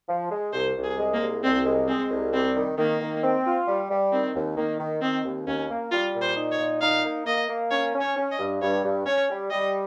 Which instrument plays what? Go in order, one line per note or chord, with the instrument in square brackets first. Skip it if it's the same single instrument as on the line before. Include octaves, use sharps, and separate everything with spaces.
[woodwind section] F3
G#3
[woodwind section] C2 [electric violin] C5
[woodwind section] C2
[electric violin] G#4
[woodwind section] G#3
[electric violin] A#3
[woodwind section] C2
[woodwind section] C2 [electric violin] C4
[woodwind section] G#3
[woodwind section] G#3 [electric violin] C4
[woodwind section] C2
[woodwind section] G3 [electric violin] C4
[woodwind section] D#3
[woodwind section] D#3 [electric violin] A#3
[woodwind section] D#3
C4
F4
G3
G3
[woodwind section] D#3 [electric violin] C4
[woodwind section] D#2
[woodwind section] D#3 [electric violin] A#3
[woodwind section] D#3
[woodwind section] D#3 [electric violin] C4
[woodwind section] D#2
[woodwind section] D#2 [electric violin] C#4
[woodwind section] A#3
[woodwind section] G3 [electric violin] F4
[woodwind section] A#2
[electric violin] C5
[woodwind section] D#4
[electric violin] C#5
[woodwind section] A#2
[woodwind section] D#4 [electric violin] F5
[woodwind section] A#3
[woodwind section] A#3 [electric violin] D#5
[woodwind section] A#3
[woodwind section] C#4 [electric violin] C#5
[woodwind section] C#4
[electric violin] C#5
[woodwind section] C#4
[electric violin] D#5
[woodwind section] G2
[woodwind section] G2 [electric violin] C#5
[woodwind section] G2
[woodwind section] C#4 [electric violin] C#5
[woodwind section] G3
[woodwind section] G3 [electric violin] D#5